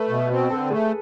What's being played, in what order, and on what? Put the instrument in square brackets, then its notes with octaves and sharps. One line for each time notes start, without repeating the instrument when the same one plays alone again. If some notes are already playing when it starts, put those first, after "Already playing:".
Already playing: [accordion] A3 [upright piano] B4
[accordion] B2
C4
[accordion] D3 [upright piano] A4
[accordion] A3 [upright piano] G#4